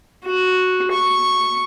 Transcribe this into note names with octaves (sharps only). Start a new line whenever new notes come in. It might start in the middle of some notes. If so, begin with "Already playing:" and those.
F#4
C#6